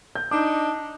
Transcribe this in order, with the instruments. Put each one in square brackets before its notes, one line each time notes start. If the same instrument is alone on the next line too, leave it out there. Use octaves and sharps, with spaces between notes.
[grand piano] G6
[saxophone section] D4 D#4 [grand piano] D6